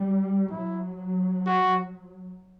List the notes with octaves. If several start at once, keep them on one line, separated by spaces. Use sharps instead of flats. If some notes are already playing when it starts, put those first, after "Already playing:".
Already playing: G3
F#3 E4
F#4